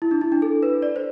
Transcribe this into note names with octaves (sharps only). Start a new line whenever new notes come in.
E4
D4
E4
D4
A4
B4
D5
C5